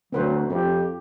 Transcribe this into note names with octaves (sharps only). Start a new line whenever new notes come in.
D2 F#3 C4 B4 C5
F2 C4 G4